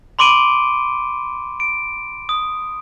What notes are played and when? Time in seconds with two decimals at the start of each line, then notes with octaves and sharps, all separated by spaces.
0.19 B5 C6 D6 D7 D#7 G7
1.60 D7
2.29 D#6